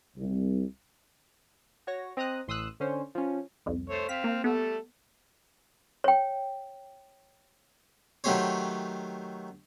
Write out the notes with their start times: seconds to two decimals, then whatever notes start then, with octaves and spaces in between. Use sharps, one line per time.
0.17 C2
1.87 F#4 C#5 A#6
2.17 C4 D#5 A#5 D#6 F#6
2.48 A1 C6 D#6 E6 F#6
2.80 D3 C#4 C5
3.15 F3 C#4
3.66 C2 F2
3.89 A3 C5 C#5
4.09 C4 F5 B6
4.24 A#3
4.44 G3 A3 B3 A4
6.04 C#5 G5
8.24 D#3 F#3 A3 G4 C5 C#5